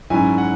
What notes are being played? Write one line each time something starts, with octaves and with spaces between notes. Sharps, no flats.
G#2 F#3 C#4 E4 G#5
F#5